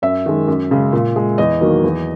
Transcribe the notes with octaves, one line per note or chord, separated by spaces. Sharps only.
F#2 E5
D#3 G#3
F#2
C#3 G#3
A#2
G#3
E2 D#5
D#3 F#3 A#3
E2